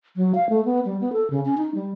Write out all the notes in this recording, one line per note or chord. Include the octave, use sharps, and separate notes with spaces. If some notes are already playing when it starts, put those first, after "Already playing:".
F#3
F5
A3
B3
G3
B3
A4
C#3
C#4
D#4
G3